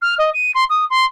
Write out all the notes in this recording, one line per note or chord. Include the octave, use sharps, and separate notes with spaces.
F6
D#5
D#7
C6
D#6
C6